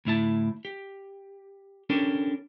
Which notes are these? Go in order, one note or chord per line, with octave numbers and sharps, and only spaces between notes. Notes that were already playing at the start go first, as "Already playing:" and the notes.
D2 A2 E4 A5
G4
C#4 D4 G4 A4 A#4